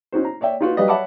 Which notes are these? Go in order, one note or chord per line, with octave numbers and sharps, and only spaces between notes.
C#4 D#4 F#4 C5
A#5
C#5 D5 E5 G5
D#4 F4 F#4 B4
F#3 G3 B4 D5 D#5 F5
C#5 E5 F#5 A5 B5 D6